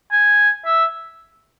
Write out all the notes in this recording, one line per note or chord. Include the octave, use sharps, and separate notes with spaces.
G#5
E5